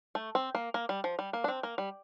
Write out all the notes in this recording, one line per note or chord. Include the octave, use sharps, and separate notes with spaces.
A3
C4
A#3
A#3
G3
F3
G3
A#3
D4
C4
A#3
G3